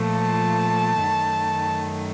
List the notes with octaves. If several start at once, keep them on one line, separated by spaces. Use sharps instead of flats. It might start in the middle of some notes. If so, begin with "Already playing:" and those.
Already playing: A#2 F3 A3
A5
F#2 D#3 A3